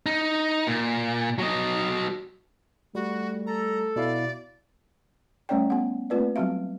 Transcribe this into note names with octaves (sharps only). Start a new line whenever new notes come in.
D#4
A#2
F#3 D#5
G3 A3 F#4
A4 A#5
B2 E4 D5 F5
G3 A3 C#4 C#5 D5 G5
B3 F#5
A3 A#3 C4 F4 B4 D5
F#3 G3 C4 F#4 E5 F5